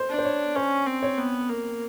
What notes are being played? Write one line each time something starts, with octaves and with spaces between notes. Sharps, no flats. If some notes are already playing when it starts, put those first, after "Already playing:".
Already playing: C5
D4
C5
C#5
C#4 C5
C4
C#5
B3
A#3